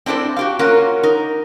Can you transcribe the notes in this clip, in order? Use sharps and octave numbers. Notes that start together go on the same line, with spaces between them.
C4 D4 E4 A4 C5
F#4 G4 F5
A#3 C#4 F4 F#4 A#4
D#4 A#4